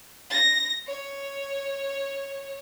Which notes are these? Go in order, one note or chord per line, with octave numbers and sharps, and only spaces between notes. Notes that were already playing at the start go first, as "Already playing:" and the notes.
A#6
C#5